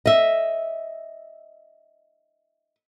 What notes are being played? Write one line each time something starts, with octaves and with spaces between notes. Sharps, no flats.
D#5 E5